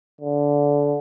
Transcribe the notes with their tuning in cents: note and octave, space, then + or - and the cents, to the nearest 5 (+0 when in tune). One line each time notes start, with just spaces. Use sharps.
D3 -20